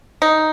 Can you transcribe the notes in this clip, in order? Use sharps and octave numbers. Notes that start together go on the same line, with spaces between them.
D#4